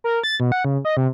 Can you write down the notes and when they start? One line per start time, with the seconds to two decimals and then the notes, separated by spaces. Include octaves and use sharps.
0.04 A#4
0.24 A6
0.40 B2
0.52 F#5
0.65 C#3
0.85 D#5
0.97 C3